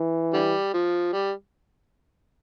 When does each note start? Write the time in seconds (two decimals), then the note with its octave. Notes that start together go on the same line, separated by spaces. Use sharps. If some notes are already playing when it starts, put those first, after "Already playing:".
Already playing: E3
0.33 D3 G3
0.74 F3
1.13 G3